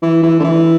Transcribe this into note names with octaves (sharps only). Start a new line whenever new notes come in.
E3
E3
D3
E3